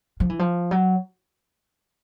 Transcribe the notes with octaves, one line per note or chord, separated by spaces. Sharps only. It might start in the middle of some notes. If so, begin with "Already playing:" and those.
F3
E3
F3
F#3